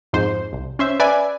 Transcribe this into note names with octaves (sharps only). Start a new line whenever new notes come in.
F2 G#2 C5
C2
C#4 C5 E5
B4 D5 E5 G#5